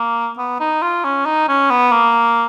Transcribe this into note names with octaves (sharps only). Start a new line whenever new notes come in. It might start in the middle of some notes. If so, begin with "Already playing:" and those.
Already playing: A#3
B3
D#4
F4
C#4
D#4
C#4
B3
A#3